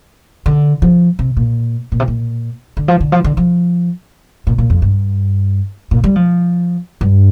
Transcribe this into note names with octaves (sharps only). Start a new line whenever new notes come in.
D3
F3
C3
A#2
A#2
C3
A#2
D3
F3
D3
F3
D3
F3
A#2
A#2
F2
G2
A#2
G3
F3
G2